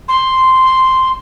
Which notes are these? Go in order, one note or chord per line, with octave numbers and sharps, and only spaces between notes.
C6